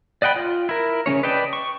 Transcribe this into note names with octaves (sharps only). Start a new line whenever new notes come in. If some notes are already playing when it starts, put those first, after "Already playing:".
D5 D#5 F#5 G5 B5
F4
E4 A#4
C#3 A3 C#4 C#5
B4 D5 D#5 G5 A5
C#6